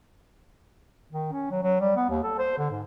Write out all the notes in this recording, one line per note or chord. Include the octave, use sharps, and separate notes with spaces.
D#3
C#4
F#3
F#3
G3
B3
D#2
A4
C5
D3
G#2